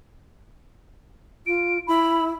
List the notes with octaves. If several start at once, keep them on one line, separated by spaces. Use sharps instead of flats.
F4 D7
E4 B5